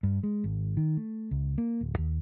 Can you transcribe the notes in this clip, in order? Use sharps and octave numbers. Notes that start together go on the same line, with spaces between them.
G2
G#3
G#1
D#3
A3
C#2
A#3
D1
D#2